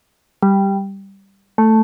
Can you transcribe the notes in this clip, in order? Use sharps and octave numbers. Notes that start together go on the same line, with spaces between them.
G3
A3